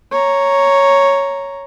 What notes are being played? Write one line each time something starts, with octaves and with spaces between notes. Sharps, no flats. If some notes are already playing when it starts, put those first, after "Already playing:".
C#5 A#5